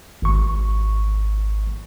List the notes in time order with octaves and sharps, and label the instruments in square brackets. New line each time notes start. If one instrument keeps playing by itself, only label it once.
[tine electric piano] G#1 C#6